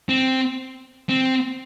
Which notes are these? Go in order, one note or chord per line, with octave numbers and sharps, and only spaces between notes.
C4
C4